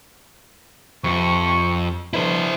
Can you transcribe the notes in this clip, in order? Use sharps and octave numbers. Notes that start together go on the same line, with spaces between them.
F2 C3 C#6
B2 D3 F3 E4 C5